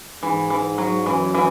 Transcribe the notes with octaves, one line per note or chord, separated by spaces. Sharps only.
G#2 E3
E3
F#3
F#2 E3
E3